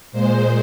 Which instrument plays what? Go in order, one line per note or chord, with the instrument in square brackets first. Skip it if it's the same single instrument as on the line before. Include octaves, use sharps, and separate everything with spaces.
[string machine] A#2 G#3 C5